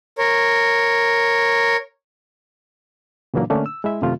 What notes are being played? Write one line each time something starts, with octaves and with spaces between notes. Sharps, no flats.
A#4 C#5
A#2 C#3 E3 F#3 A#3 D4
D3 A3 A#3 C#4 D4
E6
G#3 E4 E5
F#2 C3 D#3 A3 F4